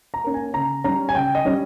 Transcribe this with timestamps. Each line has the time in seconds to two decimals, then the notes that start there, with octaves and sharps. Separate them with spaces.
0.14 A#5
0.24 A#3 C#4
0.34 G#5
0.54 C#3 A#5
0.84 G3 C#4 A#5
1.09 G#5
1.15 C#3 G5
1.35 D#5
1.45 G3 C#4